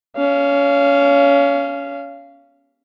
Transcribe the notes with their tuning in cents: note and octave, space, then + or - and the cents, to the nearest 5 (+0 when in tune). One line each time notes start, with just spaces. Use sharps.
C#4 +25 F5 -20